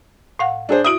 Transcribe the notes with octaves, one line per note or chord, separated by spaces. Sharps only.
A2 F5 F#5
D4 G#4 C5
E4 F#4 E5 D#6 D7